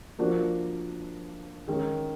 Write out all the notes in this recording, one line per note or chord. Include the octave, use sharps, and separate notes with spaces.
F3 A#3 D4 F#4
D#3 G#3 C#4